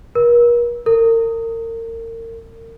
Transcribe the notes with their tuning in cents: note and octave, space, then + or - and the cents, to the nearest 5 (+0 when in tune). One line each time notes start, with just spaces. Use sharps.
A#4 +40
A#4 -35